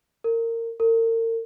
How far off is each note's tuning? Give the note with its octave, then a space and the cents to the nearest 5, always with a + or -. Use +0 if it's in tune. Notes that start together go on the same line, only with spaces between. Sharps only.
A#4 -25
A#4 -40